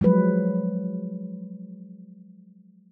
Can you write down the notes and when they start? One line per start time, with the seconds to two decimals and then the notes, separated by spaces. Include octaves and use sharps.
0.01 F3 F#3 G#3 B4